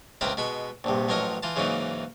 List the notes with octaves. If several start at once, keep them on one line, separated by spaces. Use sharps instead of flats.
C#2 C4 E4 A#4 B4 A5
B2 G#3 B5 C#6
A#1 G2 C3
A1 F3 F#3 A#4 C#5 D#5
E3 F4 A5
G#2 C#3 E3 F#3 A#3 D#4